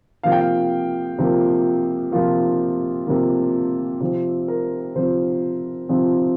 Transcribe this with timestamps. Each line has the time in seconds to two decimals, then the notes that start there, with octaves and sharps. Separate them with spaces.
0.23 C3 F3 A#3 F5
0.32 G5
0.41 F5
1.18 C3 F3 A#3
2.12 C3 F3 A#3 F4
3.07 C3 F3 A#3
4.01 C3 F3 C4
4.48 A#4
4.95 C3 F3 C4 C5
5.89 C3 F3 C4